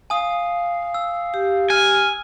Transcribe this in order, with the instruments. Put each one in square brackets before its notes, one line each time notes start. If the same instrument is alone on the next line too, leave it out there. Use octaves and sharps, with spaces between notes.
[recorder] F5 [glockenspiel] G#5 D#6
[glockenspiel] E6
[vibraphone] G4
[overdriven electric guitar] G#5 [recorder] F6